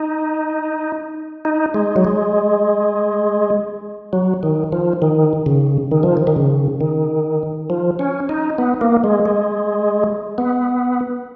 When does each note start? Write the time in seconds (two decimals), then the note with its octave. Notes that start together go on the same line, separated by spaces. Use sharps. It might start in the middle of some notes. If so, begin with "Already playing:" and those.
Already playing: D#4
1.45 D#4
1.74 G#3
1.96 F#3
2.05 G#3
4.13 F#3
4.43 D#3
4.72 F3
5.02 D#3
5.46 C#3
5.91 D#3
6.03 F3
6.17 D#3
6.27 D#3
6.36 C#3
6.81 D#3
7.70 F3
7.99 C#4
8.29 D#4
8.58 B3
8.81 A#3
9.04 G#3
9.26 G#3
10.38 B3